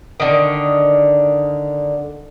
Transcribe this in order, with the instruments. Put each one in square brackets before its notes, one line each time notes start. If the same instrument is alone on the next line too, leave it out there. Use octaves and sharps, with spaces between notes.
[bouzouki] D3 D#3